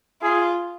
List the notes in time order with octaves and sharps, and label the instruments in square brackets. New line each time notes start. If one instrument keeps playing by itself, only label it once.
[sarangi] F4 [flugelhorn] G#4